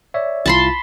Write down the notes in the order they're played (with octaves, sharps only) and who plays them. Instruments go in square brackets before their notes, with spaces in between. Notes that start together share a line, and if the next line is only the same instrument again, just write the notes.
[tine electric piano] C#5 D5 E5
[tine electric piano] C2 E4 F4 [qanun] A5 B5 C6